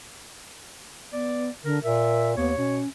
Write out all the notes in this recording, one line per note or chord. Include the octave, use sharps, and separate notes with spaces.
B3 D5
D3 A#4
A#2 A#4 E5
D#2 B3 C#5
B2 C#4